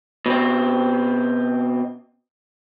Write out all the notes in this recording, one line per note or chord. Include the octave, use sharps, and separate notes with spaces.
B2 C4